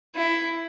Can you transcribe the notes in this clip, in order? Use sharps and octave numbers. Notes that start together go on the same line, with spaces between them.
E4